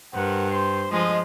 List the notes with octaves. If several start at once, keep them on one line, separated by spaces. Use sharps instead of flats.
G2 A#4 C5 F#5
C5 C6
F3 G#3 D#5